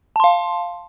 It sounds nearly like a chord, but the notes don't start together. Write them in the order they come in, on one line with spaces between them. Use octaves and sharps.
A5 C6 F5